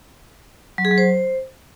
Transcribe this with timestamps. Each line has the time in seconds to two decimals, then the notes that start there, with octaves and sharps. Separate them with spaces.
0.78 F#3
0.85 G#4
0.91 F#3
0.98 C5